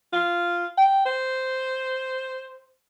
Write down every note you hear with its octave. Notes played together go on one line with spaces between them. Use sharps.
F4
G5
C5